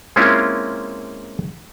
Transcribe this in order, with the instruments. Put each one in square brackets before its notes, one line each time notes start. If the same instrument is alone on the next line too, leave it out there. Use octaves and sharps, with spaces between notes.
[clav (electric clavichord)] G#3 A#3 C4 C#4 E4 F4